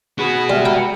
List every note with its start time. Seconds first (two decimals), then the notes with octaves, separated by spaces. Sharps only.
0.19 F#4 G#4 B4 B5
0.50 G3 G#4 E5 F6
0.65 G5 A#5 B5